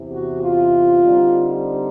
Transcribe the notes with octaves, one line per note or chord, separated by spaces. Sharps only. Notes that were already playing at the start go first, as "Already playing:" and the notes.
Already playing: E2 C3 E3
F#4
F4
D3 G3 C4 D#4